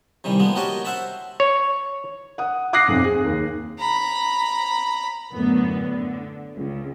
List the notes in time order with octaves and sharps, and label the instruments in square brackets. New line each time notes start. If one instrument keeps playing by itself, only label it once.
[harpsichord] C3 D#3 E3 G3
F3 G#3 A#3 B3
F#4 G4 A#4 C#5 D#5 A5
C5 E5 F#5 A5 B5
[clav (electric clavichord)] C#5
[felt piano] F#5 D#6
D6 D#6 F#6 A#6 C7
B1 F2
G#4
D#2
[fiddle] A#5 B5
[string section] F#2 A2 D3 B3
D3
C#2